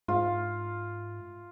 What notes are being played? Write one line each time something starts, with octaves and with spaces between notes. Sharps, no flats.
G#2 F4